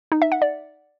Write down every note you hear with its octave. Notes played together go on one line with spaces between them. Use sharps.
D#4
E5
F#5
D5